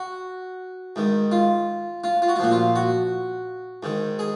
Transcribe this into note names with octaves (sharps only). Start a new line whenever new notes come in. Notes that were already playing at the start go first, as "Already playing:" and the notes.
Already playing: F#4
G#2 D#3
F4
F4
F4
F#4
F4
A#2 F3 F#4
F4
F#4
G#2 D#3
G#4